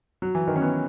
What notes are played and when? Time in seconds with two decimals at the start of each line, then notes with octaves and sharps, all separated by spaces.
0.22 F#3
0.35 E3
0.47 D#3
0.56 C#4
0.62 B3